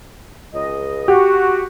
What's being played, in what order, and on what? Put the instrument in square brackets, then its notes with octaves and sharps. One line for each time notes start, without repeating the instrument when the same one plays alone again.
[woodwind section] C#2 D#5
[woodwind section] F#4 [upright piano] G4